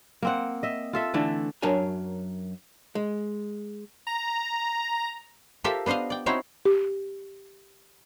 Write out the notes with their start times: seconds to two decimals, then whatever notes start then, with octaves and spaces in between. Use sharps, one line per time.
0.22 A#3 C4 F#5
0.63 D#5 E5
0.93 F4 A4 E5
1.14 D3 E3 A3 D4
1.62 F#2 F#3 D4 A#4 C#5 G#5
2.95 G#3
4.07 A#5
5.64 F4 G4 A4 A#4 C5 E5
5.86 B3 D4 C5 D#5 F5
6.10 D5 G5
6.26 C4 D#4 E4 F#4 C5 C#5
6.65 G4